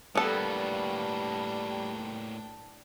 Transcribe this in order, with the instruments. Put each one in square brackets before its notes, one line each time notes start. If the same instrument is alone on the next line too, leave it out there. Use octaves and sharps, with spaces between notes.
[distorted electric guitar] A2 A#3 [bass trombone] G3 [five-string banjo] B3 A4 [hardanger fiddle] D4 G5